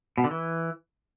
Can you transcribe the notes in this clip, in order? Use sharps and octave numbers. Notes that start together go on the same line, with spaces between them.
B2
D3
E3